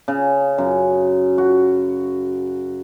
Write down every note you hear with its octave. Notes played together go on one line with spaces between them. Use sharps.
C#3
F#2
F#4